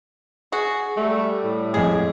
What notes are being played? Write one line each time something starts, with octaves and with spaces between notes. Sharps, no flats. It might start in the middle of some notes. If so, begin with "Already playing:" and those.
F#4 G#4
G3 A3
A2
F2 G#3 G#4